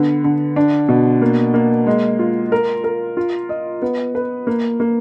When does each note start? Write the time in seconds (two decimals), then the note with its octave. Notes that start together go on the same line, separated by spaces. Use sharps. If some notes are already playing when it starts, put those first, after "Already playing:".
Already playing: D3 B3
0.24 D3
0.56 D4
0.89 B2
1.22 A#3
1.54 A#3
1.87 G#3
2.19 F4
2.52 A#4
2.84 A#4
3.17 F4
3.49 D#5
3.82 B3
4.15 B4
4.47 A#3
4.80 A#3